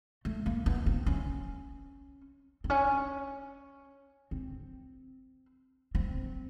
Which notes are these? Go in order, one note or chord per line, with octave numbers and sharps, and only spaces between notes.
A3
A#3
B3
C4
C#4
C4
C#4
C4
C4